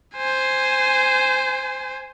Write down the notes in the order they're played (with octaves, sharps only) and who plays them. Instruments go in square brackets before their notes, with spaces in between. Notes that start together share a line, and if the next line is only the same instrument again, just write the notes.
[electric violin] C5 G#5